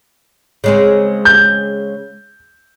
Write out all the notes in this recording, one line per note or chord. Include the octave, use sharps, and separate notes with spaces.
C#3 G#3 C4
G6